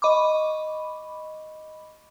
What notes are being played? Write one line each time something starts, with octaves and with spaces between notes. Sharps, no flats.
D#5 B5 C#6 D6